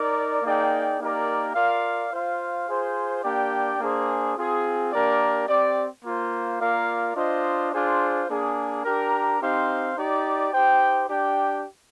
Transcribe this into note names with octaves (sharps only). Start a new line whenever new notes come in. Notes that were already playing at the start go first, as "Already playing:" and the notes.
Already playing: D#4 A#4 D5
A#3 D#4 G#4 D5 G5
A#3 D#4 G4 A#4 D5
F4 A#4 D5 F5
F4 C5 F5
F4 G#4 C5
A#3 D4 G4 D5 G5
A#3 D4 G#4 C5
C4 F4 G#4
A#3 D4 G4 A#4 D5
C4 G4 D5
A#3 F4 C5
A#3 F4 A#4 D5 F5
D4 F4 C5 D#5
D4 F4 G#4 C5
A#3 D4 G#4
D4 G4 A#4
C4 D#4 G4 C5 F5
D#4 G4 D5
D#4 G4 C5 G5
D4 G4 D5 G5